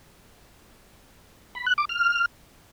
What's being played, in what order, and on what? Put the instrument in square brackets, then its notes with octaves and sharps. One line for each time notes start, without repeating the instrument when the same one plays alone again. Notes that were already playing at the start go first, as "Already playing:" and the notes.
[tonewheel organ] B5
F#6
D6
F6